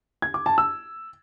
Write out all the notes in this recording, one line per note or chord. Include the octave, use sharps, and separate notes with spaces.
G#6
D6
A5
E6